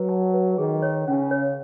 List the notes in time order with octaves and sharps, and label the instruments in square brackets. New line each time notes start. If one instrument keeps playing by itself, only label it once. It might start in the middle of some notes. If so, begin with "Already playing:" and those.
Already playing: [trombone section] F#3 [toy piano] B4
[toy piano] A5
B4
[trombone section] D#3 [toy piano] G#4
[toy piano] C#5
[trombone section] C#3 [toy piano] C#4
[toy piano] C#5